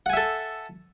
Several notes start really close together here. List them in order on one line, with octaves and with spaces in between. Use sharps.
F#5 G#5 E5 A4